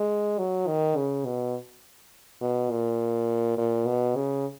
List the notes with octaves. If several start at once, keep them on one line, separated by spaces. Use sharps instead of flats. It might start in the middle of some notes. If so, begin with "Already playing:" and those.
Already playing: G#3
F#3
D#3
C#3
B2
B2
A#2
A#2
B2
C#3